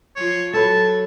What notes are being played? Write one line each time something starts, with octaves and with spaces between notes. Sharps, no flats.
F3 F4 C#5
F#3 A4 B4 C#5 A5